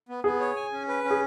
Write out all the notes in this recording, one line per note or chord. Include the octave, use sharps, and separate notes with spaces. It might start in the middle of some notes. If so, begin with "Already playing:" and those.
B3
B3 G#4
C#5
G#5
C#4
B4
C#4
G#4